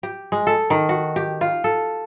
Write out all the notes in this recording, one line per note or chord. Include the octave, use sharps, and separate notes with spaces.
G4
G#3
A4
D#3
F#4
G4
F4
A4